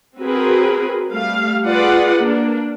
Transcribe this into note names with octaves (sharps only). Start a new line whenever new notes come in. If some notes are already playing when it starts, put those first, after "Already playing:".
C4 F#4 G#4 A#4 B4
G3 A3 F5
F4 G#4 B4 D5 F#5
A#3 D4